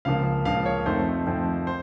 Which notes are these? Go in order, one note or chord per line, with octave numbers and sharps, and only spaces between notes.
C#2 C#3 F3 A#3 F5
C#2 C#3 F3 A#3 F5
C#5
F2 D#3 A3 C4 C5
F2 D#3 A3 C4
C5